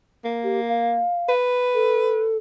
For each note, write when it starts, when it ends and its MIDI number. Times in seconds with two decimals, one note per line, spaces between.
0.24 1.04 58
0.44 0.60 67
0.69 1.32 77
1.29 2.31 71
1.74 2.37 69